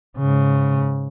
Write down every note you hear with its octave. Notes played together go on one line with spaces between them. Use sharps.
G#2 C#3